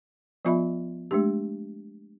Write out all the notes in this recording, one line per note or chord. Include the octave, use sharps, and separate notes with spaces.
F3 B3 F4 D#5 E5 B5
G#3 A3 D4 G4